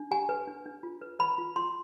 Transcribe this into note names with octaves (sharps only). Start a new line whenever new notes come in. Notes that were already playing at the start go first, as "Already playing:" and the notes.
Already playing: D4
G4 G#5
B4
D4
D4
F4
B4
B4 B5
F4
F4 C6